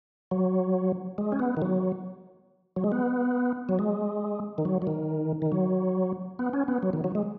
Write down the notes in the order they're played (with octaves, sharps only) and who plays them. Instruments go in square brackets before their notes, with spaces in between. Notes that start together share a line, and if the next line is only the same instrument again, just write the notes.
[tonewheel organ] F#3
G#3
C#4
B3
D#3
F#3
F#3
G#3
B3
F#3
G#3
D#3
F#3
F#3
D#3
D#3
F#3
B3
C#4
B3
F#3
D#3
F#3
G#3